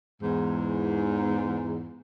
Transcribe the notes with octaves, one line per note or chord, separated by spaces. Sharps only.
E2 G#2